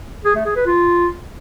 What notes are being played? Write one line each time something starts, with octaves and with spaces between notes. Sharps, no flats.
G#4
A3
G#4
B4
F4